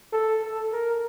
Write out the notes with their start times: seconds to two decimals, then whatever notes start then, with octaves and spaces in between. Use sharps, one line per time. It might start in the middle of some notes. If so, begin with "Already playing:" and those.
0.13 A4
0.42 A4
0.72 A#4